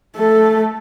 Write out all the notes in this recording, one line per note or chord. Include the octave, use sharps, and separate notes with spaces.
A3 A4